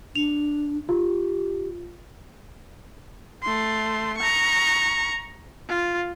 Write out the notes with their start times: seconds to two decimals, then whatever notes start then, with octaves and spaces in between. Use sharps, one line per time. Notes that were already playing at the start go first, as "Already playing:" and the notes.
0.15 D4 F7
0.89 F4 G4
3.43 A3 C6
4.18 A#5 C#6
5.68 F4